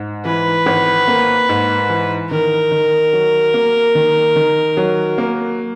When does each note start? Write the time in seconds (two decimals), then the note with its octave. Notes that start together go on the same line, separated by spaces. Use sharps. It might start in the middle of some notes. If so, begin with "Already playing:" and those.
Already playing: G#2
0.25 E3 B4
0.66 G#1
1.08 A#3
1.49 G#2
1.90 E3
2.31 D#3 A#4
2.71 D#3
3.13 F#3
3.54 A#3
3.95 D#3
4.36 D#3
4.77 F#3
5.18 A#3